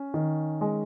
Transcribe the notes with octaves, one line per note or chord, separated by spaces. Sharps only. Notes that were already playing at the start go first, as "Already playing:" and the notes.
Already playing: C#4
D#3
G#3